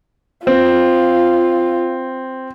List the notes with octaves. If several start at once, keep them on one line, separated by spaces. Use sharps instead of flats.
C4 F4